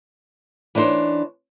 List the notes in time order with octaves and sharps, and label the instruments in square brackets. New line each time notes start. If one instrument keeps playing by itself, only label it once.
[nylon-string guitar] E3 D4 D#4 C5 C#5